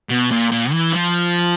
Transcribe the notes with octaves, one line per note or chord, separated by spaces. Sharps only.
B2
A#2
A#2
E3
F3